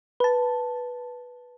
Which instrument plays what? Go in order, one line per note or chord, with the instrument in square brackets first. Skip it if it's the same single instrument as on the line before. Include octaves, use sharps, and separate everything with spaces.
[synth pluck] B4 A5